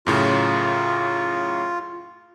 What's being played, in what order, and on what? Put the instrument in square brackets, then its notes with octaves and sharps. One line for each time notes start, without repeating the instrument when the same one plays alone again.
[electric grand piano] F#2 A2 C#3 [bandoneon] F4